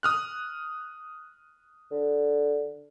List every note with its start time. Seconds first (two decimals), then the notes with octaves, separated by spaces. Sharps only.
0.03 D#6 F6 F#6
1.91 D3